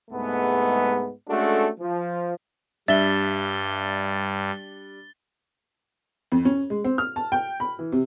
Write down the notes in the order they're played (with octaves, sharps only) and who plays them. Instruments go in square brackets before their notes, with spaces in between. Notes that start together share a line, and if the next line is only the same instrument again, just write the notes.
[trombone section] C2 G#2 G#3 A3 B3
G#3 A3 C#4 D4 F#4 A4
F3
[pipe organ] G2 [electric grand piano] G3 D4 [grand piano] E5 [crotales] A6 G7
[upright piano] F2
C#4
G#3
C4
F6
A5
G5
B5
E3
C3